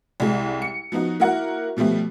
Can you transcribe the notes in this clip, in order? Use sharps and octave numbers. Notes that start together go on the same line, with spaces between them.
C2 G#3
C#7
F3 B3 D#4 F#4
A#3 E4 F#4 A#4 F#5
B2 F3 G3 A3 B3